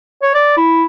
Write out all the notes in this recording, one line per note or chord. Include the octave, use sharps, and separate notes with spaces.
C#5
D5
E4